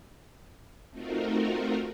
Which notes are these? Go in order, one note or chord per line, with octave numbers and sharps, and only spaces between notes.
A3 C4 D#4 F4 F#4 A#4